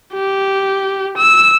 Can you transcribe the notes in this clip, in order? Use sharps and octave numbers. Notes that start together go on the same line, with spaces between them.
G4
E6